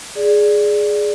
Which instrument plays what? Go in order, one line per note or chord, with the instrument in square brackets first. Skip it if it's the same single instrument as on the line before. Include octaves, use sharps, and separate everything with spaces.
[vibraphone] G#4 D5